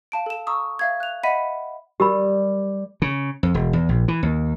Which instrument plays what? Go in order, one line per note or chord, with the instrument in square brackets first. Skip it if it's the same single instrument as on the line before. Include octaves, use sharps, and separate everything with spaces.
[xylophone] F5 A5 D7
A4 E7
A#5 C#6 D#6 E6
E5 F5 G#6
F#6 F7
D#5 E5 F#5 B5 B6 D#7
[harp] G3 [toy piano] G4 A#4 B5
[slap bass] C#3
F2
E1
E2
A#1
E3
D#2